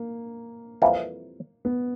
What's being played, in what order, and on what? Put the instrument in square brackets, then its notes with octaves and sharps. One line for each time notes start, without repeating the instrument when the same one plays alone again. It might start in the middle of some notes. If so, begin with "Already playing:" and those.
Already playing: [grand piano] A#3
[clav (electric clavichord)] F2 C3 E3 G3 A#3
[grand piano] B3